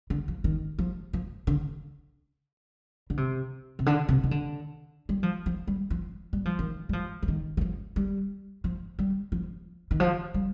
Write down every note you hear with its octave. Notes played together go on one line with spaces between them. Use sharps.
D3
F3
D#3
F3
F3
D3
D3
C3
C3
D3
C3
D#3
D3
G3
F3
F3
G3
F3
G3
F3
D#3
G3
F3
F3
D#3
D#3
F3
G3
F3
G3
F3
D#3
F3
G3